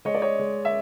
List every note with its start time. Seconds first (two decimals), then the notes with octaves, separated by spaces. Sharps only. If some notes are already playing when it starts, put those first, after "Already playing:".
0.05 G#3 C#5 D#5
0.15 D5
0.22 C#5 D#5
0.39 G#3
0.65 E5